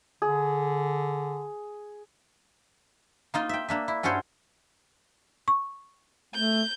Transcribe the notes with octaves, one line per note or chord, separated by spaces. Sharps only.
D3 G#4
A#3 D#4 F4
E5 G5
A#3 D4 E5
E4
G2 C#4 F#4 A4 C5 C#5
C#6
A3 G6